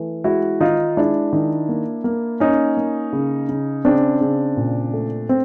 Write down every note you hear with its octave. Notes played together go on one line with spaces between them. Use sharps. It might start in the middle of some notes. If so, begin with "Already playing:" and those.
Already playing: E3 A3
G#3 E4 F#4
D#3 D#4 F4
G#3 D4 E4
D#3
A#3
A#3
A#3 C#4 D#4
A#3
C#3
C#3
C#3 C4 D4
C#3
A#2
A3
C4